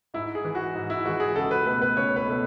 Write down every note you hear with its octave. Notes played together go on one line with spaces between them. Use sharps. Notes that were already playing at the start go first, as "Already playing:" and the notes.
G#2 E4
G#4
E3 G#3
F#4
G#2
E4
E3 G#3 F#4
G#4
C#2 A4
B4
B2 A3 B4
B4
C#2 C#5
B4
B2 A3